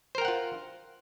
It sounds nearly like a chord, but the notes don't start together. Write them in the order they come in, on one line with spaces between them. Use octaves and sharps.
C5 A#4 G5 F#5 F4